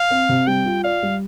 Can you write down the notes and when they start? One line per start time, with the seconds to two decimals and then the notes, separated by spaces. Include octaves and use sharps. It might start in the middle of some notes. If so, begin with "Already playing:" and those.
Already playing: F5
0.10 C4
0.29 C3
0.47 G3 G5
0.66 F4
0.84 D5 F5
1.02 G3